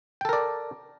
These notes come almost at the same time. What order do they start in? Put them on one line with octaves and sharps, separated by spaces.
G5 A4 A#4 D5